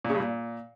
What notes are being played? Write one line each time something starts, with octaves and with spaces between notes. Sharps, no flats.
A#2
C#3
G2
A#2